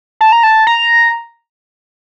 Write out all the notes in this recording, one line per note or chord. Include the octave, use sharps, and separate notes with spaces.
A5
A#5
A5
A#5